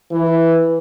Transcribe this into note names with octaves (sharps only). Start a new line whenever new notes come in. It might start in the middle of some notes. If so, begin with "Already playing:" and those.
E3